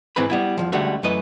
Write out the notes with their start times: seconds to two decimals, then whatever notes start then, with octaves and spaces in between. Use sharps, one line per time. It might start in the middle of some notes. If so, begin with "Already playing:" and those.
0.16 G#2 E3 C4 B4 B5
0.30 G3 B3 E4
0.57 E2 A2 F3
0.72 C#2 D3 G3 A3 F#4
1.03 F#2 E3 A3 B4 D#5